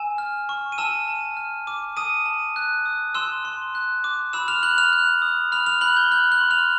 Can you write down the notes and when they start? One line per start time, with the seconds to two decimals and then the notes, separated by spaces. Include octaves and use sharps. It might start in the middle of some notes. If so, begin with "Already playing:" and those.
Already playing: G#5 E6 E7
0.18 F6
0.49 C#6
0.72 D#7
0.78 A5 E6 E7
1.08 A5
1.37 F6
1.67 D6
1.97 A5 D#6 D#7
2.26 A5
2.56 F#6
2.86 D#6
3.15 C6 E6 E7
3.45 C6
3.75 F#6
4.04 D6
4.33 B5 E6 E7
4.48 F6 F7
4.63 B5 F#6 F#7
4.78 F6 F7
4.93 F#6
5.22 D#6
5.52 B5 F6 F7
5.66 F6 F7
5.81 B5 F#6 F#7
5.97 G6 G7
6.11 F6 F#6 F#7
6.32 F#6 F#7
6.41 C6
6.50 F6 F7